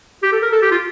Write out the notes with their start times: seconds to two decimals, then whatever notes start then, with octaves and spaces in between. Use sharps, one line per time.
0.23 G4
0.32 A4
0.42 A#4
0.52 A4
0.62 G4
0.71 F4